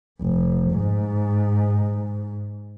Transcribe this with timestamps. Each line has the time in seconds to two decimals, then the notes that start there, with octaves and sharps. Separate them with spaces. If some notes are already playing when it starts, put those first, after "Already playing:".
0.21 F1
0.71 G#2